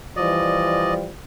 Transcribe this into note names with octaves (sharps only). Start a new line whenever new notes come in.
E3 F3 G3 D5 D#5